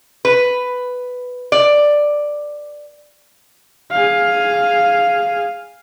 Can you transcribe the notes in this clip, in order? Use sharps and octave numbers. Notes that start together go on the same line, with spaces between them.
B4
D5
G#4 F5